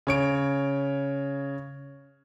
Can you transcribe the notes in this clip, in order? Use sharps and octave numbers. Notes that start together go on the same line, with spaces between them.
C#3 C#5 D7